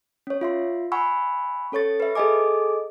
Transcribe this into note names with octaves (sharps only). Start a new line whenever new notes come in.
C#4 C#5
F4 E5 C6
F#5 G#5 B5 C#6 E6
C#4 A4 C#5 C#6 A6
B4 E5
G#4 A4 D#5 G#5 D6